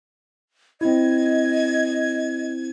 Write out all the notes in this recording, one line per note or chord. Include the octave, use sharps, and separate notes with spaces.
C4 E4 D#5 G#6